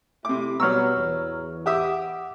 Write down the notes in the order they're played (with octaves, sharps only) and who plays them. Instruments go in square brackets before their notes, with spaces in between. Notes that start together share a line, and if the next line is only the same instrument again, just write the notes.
[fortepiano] C3 D6 [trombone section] A3 E4
[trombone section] B2 G3 B3 [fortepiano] F#3 E6 [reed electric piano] A#5 C#6 F6
[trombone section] E2
[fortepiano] G4 E5 D#6 [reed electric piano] F#5 D6